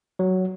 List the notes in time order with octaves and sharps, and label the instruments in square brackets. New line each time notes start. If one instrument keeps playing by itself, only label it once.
[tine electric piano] F#3